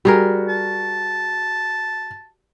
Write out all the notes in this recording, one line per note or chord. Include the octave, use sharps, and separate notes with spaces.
G3 F#4 G#4 A#4
A5